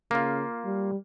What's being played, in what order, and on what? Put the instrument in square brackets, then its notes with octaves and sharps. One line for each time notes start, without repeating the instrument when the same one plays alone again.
[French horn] C#3 [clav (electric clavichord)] A#3 F4
[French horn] G3